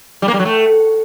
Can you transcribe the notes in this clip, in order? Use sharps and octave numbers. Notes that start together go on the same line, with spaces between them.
G3
A#3
G3
F#3
A3